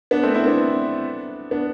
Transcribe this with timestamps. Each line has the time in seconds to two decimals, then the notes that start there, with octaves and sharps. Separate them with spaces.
0.11 B3 D4
0.23 A3 C4
0.35 C4 E4
0.46 B3 D4
1.51 B3 D4